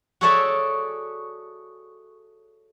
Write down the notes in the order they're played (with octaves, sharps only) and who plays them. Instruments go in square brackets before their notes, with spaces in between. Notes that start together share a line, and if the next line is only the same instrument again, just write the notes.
[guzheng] F#4 G#4 A4 C#5 D5 E5